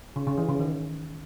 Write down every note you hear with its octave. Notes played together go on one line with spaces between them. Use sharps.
C#3
C#3
E3
C#3
D#3